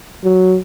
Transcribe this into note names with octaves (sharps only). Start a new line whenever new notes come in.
F#3